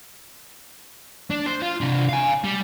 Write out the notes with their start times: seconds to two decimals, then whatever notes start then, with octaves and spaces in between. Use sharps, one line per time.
1.30 D4
1.46 C5
1.62 F4
1.81 C3 D4
2.09 F5 G#5
2.44 G3